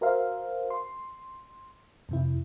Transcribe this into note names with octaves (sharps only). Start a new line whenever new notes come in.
F#4 A#4 C5 E5 F5
C6
F2 C3 E4